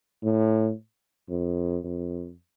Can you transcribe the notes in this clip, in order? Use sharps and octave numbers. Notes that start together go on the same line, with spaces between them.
A2
F2
F2